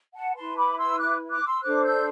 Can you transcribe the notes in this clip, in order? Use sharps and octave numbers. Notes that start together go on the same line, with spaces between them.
F#5 A5
E4 B4 A5 C6
B5 D6
C6 E6
D6 F#6
D6 F#6
C6 E6
D4 A4 C5 D6 F#6
E6 G6